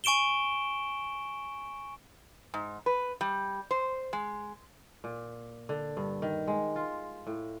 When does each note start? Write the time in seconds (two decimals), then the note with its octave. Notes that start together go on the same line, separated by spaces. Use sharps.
0.04 G#5 C#6 D7 E7 G7
2.54 G#2
2.86 B4
3.21 G3
3.71 C5
4.13 G#3
5.04 A#2
5.69 D3
5.97 G2
6.22 D#3
6.47 G#3
6.76 F4
7.27 A2